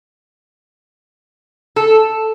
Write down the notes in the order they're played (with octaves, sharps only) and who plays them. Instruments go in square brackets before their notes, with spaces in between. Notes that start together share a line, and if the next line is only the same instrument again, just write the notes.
[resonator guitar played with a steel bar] A4